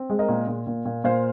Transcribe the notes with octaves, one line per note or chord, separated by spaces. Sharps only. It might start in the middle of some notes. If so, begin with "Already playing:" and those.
Already playing: C4
G#3
A#4 D#5
A#2
A#2
A#2
A#2
A#2 C5 F5